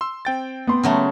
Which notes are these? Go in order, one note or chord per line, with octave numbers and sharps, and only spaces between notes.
C6 E6
C4 G5 A6
B3 C6
C#3 F#3 A3